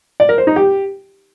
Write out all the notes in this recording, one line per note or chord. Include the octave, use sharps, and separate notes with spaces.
D5
A#4
C5
D#4
G4